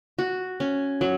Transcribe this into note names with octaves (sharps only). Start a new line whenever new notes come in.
F#4
C#4
F#3